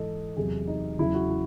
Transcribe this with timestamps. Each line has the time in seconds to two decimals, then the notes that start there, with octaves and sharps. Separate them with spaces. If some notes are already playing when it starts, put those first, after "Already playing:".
Already playing: G#2 E3 A4 D#5
0.37 E2 C3 F#3 G#4
0.68 D#4
0.99 E2 C#3 F#3 E4
1.15 F#4
1.30 E4